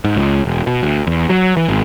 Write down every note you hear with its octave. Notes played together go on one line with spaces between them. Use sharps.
G#2
C#2
E1
B2
D2
E2
F#3
E3
G#1